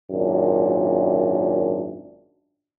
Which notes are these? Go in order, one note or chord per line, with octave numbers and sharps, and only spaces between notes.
G#1 F#2 A#2 D4